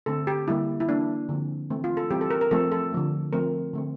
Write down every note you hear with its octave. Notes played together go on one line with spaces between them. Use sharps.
D3 A3 C4 A4
G4
D3 G3 A#3 E4
E4
E3 A#3 D4
D3 F3 C4
E3 A3 C4
F4
A4
E3 G3 C4 G4
A4
A#4
A#4
F3 A3 C4 A4
A4
D3 F3 A3
F3 A3 C4 A#4
D3 A3 C4